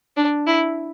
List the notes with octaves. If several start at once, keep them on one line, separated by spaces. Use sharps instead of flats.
D4
E4